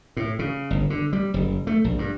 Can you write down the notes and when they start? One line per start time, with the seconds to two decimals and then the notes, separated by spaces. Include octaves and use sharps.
0.17 A2
0.39 C#3
0.70 G1
0.90 D3
1.13 G3
1.34 F#1
1.67 A3
1.84 A#1
1.99 G2